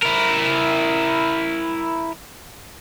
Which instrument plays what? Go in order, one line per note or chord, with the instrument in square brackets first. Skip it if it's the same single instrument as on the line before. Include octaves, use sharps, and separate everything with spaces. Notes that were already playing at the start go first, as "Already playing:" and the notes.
[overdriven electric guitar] E4 A#4